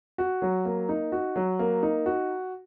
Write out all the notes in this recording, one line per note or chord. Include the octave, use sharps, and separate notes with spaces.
F#4
F#3
A#3
D#4
F#4
F#3
A#3
D#4
F#4